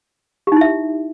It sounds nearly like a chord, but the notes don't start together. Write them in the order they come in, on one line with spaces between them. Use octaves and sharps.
G4 D#4 E4 E5